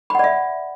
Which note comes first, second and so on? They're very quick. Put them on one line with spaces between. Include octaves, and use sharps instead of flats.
B5 F#5 D5 E5